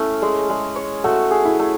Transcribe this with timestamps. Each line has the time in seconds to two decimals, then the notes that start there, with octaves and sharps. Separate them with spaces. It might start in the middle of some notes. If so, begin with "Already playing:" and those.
Already playing: A3 C#4 E4
0.22 G#3
0.50 G#3
0.76 C#5
1.04 A3 F#4
1.31 G#4
1.45 E4
1.59 A3